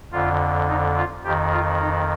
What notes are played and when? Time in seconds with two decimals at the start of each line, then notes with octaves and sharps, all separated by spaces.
0.12 F2 D3 F4
0.68 D#4
0.96 F4
1.24 F2 D#3 G4
1.52 F4
1.80 D#4